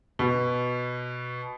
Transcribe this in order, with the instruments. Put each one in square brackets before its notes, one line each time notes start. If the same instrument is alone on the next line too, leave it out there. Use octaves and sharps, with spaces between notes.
[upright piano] B2